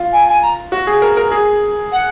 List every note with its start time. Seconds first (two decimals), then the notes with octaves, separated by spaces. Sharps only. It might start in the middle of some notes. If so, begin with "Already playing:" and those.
Already playing: F4
0.12 G#5
0.28 G#5
0.42 A#5
0.72 F#4
0.87 G#4
1.02 A#4
1.17 A#4
1.32 G#4
1.92 F#5